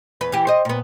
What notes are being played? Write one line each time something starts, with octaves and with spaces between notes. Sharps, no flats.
E2 B4
E3 G4
C5 D#5
A#2 B3